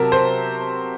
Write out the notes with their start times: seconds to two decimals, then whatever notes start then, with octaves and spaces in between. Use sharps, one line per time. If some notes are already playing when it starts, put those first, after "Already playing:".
Already playing: C3 F#3 A#4 A5
0.12 C5